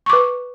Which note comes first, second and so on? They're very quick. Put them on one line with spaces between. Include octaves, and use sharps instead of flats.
C#6 D6 B4